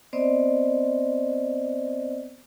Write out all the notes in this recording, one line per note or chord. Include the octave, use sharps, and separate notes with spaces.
B3 C4 C5 D5 D#5